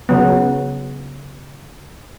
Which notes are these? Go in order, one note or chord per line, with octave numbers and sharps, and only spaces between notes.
C#3 F#3 B3